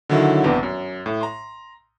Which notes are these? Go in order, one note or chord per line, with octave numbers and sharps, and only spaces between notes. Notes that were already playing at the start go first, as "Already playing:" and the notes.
D3 D#3 F#3 E4
A#1 G2 C3 B3 G4 G5
F#2
A2
A#5 C6